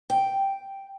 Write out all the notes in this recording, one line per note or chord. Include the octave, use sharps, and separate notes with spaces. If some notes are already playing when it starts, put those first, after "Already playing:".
G5